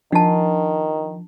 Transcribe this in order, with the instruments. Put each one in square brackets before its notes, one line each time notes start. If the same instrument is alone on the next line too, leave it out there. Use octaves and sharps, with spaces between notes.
[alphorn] D#3 [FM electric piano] F3 [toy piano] D4 A5